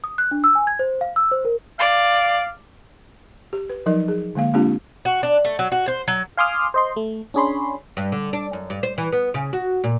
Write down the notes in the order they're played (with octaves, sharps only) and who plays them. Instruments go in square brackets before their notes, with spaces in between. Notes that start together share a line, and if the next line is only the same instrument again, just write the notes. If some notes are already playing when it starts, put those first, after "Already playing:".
[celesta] D#6
F#6
D4
E6
G#5
G#6
C5
F5
E6
C5
A#4
[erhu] D5 [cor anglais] F5
[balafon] G4
B4
F3 F#3 D#4 A#4 D#5
G#4
D3 G#3 A#3 F5
G#3 A#3 C4 D4 F4 G4
[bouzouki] F#4
D4
A3
F#3
F#4
C5
F#3
[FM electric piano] F5 G#5 C6 D6 D#6 F6
C5 D#5 C6
A3
C#4 D4 G#4 C#5 B5 C6
[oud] G2
D3
D4
F#2
G2
C5
E3
B3
C#3
F#4
A#2